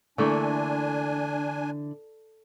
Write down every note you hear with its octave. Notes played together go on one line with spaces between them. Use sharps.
D3 E3 A3 A#3 D4 G#5